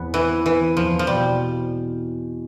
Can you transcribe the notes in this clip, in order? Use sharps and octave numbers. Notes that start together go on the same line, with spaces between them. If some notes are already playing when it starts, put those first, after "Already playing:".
Already playing: E2 B3 C4
E3 C4
E3 C4
E2 F3
F3
B2 G3